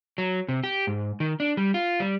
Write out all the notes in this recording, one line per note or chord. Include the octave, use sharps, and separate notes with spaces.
F#3
C3
G4
G#2
D#3
D4
G3
F4
G3